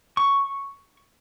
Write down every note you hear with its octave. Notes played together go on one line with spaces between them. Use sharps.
C#6